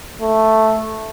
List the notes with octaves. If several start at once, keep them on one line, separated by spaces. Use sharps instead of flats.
A3